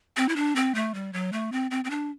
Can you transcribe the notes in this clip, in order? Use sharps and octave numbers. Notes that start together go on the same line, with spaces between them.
C4
E4
D4
C4
A3
G3
F#3
A3
C4
C4
C4
D4